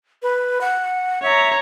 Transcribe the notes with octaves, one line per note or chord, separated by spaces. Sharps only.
B4
F#5
C#5 E5 A#5